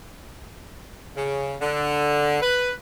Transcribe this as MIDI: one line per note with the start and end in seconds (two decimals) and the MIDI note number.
1.17 1.55 49
1.61 2.40 50
2.42 2.72 71